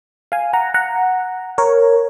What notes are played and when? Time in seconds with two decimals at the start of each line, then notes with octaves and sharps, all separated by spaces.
0.32 F5 G#5
0.53 F#5 A#5
0.74 F#5 A#5
1.58 A#4 C#5